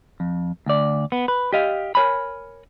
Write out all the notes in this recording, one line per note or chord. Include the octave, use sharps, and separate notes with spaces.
F2
D2 D5
B3
B4
G4 D#5 F5
A#4 B4 C#5 G#5 B5